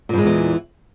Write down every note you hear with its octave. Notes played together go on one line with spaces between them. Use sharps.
E2 G2 A#2 E3 G#3